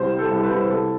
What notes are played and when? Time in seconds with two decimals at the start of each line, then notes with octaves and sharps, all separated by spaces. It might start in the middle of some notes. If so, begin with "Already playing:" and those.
Already playing: C2 G3 C5
0.12 G3
0.19 A4
0.31 C2
0.43 B4
0.50 C2
0.69 C2 A4